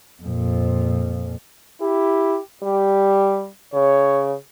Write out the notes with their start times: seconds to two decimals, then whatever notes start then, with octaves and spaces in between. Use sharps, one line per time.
0.23 F2 A#2
1.81 E4 G4
2.63 G3 G4
3.74 C#3 C#5